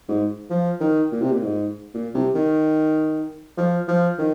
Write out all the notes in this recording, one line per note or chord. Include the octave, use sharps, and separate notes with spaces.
G#2
F3
D#3
A#2
C3
A#2
G#2
A#2
C3
D#3
F3
F3
D#3